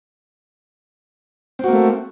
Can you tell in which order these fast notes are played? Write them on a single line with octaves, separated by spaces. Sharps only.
C4 F#4 A#3 A3